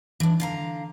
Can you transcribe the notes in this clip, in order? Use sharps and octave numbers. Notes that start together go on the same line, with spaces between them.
E3 D4
D3 F5 A#5